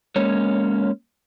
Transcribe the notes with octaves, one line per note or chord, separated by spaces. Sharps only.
G#3 A#3 C#4 C#5